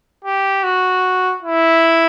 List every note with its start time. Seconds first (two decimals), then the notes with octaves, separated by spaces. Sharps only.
0.25 G4
0.63 F#4
1.43 E4